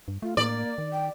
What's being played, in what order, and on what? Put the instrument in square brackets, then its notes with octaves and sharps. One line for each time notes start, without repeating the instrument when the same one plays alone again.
[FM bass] G2
[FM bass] A3 [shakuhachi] F4
[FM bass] A2 [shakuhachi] A#3 [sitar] D5
[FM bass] D#3
[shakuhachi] G5